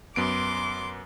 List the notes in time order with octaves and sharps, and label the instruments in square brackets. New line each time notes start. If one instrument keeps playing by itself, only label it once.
[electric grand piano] F#2 B3 D7 [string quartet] C6 D6